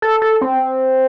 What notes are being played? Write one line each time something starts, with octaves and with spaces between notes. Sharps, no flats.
A4
A4
C4